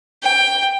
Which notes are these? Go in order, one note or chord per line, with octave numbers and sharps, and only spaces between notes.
G5